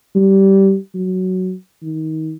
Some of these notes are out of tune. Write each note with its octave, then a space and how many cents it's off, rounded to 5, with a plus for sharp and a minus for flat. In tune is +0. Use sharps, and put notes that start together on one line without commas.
G3 -15
F#3 +5
D#3 +25